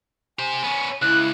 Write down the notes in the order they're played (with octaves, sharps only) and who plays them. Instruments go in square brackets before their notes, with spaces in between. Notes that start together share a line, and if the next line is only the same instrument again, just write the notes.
[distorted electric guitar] G4 C5 [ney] G#5
[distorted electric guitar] B3 C#4
[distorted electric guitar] C#2 [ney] E4 [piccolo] F#6